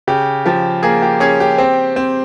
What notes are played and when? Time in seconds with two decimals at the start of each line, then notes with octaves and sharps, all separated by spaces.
0.07 C#3 G4
0.46 F3 G4
0.83 A#3 G#4
1.02 G4
1.20 C#4 G#4
1.40 G4
1.58 C4
1.96 C4